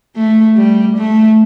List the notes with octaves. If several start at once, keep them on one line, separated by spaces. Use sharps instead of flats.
A3
G3
A3